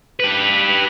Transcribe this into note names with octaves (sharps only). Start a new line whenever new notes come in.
G4 B4